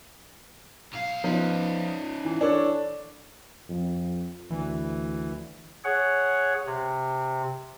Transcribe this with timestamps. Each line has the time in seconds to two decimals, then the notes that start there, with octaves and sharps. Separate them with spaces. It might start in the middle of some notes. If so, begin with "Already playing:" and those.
0.93 B1 F5
1.24 F3 B3 C#4 D#4
2.25 E3
2.41 D4 A4 C#5
3.69 F2
4.50 D2 E3
5.84 G#4 C#5 F#5
6.66 C3